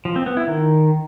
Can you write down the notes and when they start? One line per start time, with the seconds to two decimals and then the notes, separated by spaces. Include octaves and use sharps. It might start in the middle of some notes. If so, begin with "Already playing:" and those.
0.05 F3
0.16 C4
0.26 B3
0.37 E4
0.47 D#3